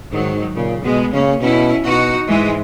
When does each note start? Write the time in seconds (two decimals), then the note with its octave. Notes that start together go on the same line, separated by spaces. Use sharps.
0.12 G#2 D#3 F#3
0.55 A#2 C#3
0.83 B2 G#3 B3
1.13 C#3 A#3 C#4
1.41 B2 C#4 E4
1.84 B2 D#4 F#4
2.28 G#2 E3 G#3